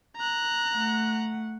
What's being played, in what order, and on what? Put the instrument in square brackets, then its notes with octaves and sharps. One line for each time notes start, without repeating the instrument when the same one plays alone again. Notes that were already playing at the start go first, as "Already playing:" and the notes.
[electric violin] A#5 F#6
[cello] A3 F#5